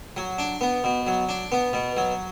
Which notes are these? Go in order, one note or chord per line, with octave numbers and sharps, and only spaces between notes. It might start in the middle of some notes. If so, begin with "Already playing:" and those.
F#3
D4
B3
B2
F#3
D4
B3
B2
F#3